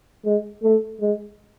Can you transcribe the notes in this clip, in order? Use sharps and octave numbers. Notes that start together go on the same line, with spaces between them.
G#3
A3
G#3